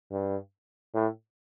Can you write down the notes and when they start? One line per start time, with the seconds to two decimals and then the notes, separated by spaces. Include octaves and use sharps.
0.12 G2
0.94 A2